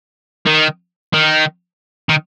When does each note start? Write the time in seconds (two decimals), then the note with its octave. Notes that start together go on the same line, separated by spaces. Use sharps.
0.46 D#3
1.13 D#3
2.09 D#3